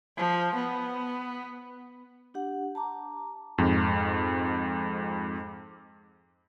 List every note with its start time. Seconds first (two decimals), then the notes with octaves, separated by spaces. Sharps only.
0.17 F3
0.56 B3
2.34 D4 G4 F#5
2.75 A5 A#5 D6
3.58 F2 G#2